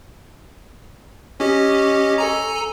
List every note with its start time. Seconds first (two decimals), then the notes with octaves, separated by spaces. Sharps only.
1.40 C#4 G4 C#5 D#5
2.18 A4 G#5 A#5